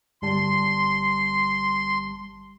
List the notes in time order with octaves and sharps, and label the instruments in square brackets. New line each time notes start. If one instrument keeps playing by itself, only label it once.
[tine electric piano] G1 G3 A5 [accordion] C6